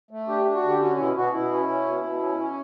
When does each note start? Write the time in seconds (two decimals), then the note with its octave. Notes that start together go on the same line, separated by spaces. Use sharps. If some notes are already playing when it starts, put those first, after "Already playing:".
0.11 A3
0.28 D4 G4
0.45 D4
0.54 F#4
0.63 D3
0.69 G4
0.80 C#4 F#4
0.98 B2 E4
1.16 B2 F#4
1.33 B2 E4
1.51 C#4
1.68 C#4
1.86 B2
2.03 B2
2.21 C#4
2.39 C#4